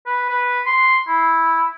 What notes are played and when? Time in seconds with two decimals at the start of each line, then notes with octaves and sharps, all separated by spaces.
0.06 B4
0.30 B4
0.66 C6
1.08 E4